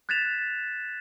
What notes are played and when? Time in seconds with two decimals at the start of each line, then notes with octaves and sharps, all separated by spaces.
0.09 F#6 G#6 A6 B6 E7 F7